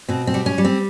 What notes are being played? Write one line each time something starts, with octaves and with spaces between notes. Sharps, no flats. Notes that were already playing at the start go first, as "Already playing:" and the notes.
B2 C4
C4
G3
C#4
G3
C4